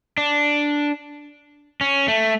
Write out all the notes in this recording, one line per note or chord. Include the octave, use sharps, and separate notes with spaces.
D4
C#4
A3